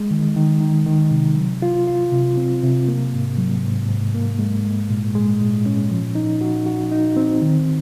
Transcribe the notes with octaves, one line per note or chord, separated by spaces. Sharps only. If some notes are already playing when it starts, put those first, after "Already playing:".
Already playing: G#3
D#3
D#3
D#3
D#3
C3
F#3
F4
F4
C3
C4
C3
A#3
G#2
F#3
G#2
G#2
A#3
G#3
G#3
A#2
G#3
A#2
C#4
F3
D#4
F#4
F#4
D#4
C4
D#3